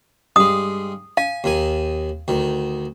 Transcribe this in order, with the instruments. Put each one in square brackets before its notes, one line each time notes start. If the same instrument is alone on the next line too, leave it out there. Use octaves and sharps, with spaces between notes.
[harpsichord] G2 G#3 [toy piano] D#6
[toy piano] F5 [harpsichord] G#5
[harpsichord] D#2 D#3 G#5
D2 D#3